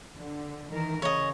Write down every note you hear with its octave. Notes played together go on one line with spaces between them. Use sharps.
D3
D#3 E3 A#4
C#3 C#5 D#5